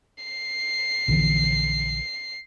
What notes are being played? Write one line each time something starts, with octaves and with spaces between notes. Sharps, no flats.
C7
A#1 D3 E3